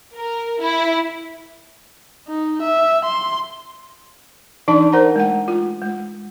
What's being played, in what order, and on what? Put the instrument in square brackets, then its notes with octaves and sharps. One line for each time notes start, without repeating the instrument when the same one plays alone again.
[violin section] A#4
E4
[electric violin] D#4
E5
C6
[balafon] E3 D4 D#4 D5 A5
A#4 C5 F#5 A#5
G#3 A3 F#5
F4
G#3